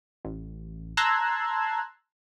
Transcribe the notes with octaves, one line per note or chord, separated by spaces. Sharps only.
A1
A5 A#5 C6 E6 F#6 G#6